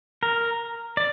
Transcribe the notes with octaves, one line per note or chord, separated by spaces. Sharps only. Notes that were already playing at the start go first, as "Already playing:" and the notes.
A#4
D5